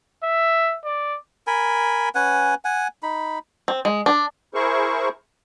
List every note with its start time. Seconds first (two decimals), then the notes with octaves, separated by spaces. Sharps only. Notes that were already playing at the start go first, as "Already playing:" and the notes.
0.24 E5
0.85 D5
1.47 A#4 G#5 B5
2.15 C#4 B4 F#5 G#5
2.65 F#5 G#5
3.03 D#4 B5
3.68 C4
3.85 G#3
4.06 D4
4.54 E4 G#4 A#4 C5 C#6